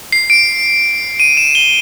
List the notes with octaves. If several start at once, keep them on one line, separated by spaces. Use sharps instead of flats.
C7
D7
D#7
E7
G7